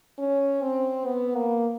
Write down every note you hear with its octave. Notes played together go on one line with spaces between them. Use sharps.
C#4
C4
B3
A#3